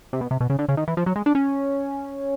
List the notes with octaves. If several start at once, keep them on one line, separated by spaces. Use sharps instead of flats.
C3
B2
C3
B2
C#3
D3
C#3
D#3
E3
F3
F#3
G#3
D4
C#4